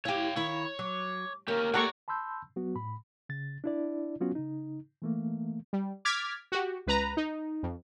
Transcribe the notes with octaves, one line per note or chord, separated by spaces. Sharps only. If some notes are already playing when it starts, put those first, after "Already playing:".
E4 G4 C#5 F5 G5
D#3 E4 C#5
F#3 D6
A#3 C#4 G4 A#4
A#3 G4 A4 C#5 D5 F#5 A#5 C#6
A5 B5 C6 E6 G6
F#3 B3 F#4
A2 B5
C#3 A6
D4 E4 D5
F#3 B3 C#4 F4 F#4
C#3 D#4
E3 A3 A#3
G3
D6 F6 G#6 A6 B6
F#4 G4
C#2 B4 A#5
D#4
F2